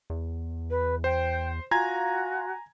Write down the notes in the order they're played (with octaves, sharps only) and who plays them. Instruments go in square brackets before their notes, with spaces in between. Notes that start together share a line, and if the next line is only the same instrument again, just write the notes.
[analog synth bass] E2
[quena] B4
[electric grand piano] C5 [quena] G5
[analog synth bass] F4 [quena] F#4 [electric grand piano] G#5 A#5 G#6